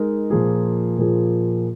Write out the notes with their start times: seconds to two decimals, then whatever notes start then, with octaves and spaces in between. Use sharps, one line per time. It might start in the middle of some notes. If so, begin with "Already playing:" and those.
Already playing: G#3 D#4 A#4
0.30 A#2 F3 A#3 G#4
0.98 A#2 F3 A#3 G#4